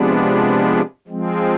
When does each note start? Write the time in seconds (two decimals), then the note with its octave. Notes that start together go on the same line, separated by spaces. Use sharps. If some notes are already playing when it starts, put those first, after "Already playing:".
Already playing: C3 F3 G#3 B3 D4
1.08 F3 G#3 C4